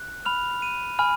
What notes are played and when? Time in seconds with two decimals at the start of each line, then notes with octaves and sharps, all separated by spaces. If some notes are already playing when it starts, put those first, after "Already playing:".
Already playing: F#6
0.25 B5 F6 F7
0.62 D#7
0.99 G#5 B5 F6